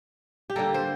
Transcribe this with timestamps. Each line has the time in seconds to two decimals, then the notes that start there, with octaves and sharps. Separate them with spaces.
0.50 G4
0.56 D3 G3 A#3 A4
0.74 C5